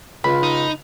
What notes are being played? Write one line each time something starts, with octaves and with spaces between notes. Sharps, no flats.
C#2 F4 B5
D#4